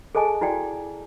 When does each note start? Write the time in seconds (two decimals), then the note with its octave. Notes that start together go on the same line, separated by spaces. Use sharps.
0.15 G#4 A4 D#5 G#5 A5
0.41 E4 F#4 D5 G5